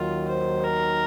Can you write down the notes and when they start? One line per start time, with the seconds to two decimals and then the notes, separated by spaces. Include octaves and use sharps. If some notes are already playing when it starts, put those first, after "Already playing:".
Already playing: D#2 D#3 F#3 F4
0.28 C5
0.63 A#4